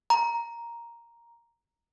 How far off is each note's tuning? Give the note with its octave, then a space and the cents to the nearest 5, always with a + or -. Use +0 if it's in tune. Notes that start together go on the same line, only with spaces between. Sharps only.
A#5 +5